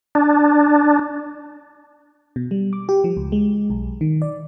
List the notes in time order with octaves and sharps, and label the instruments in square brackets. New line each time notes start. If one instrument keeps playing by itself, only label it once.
[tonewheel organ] D4
[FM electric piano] B2
G3
D6
G4
F3
C#2
G#3
B1
D#3
D5